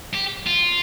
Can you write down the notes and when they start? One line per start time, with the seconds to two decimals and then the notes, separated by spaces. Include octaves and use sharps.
0.15 G4
0.47 F4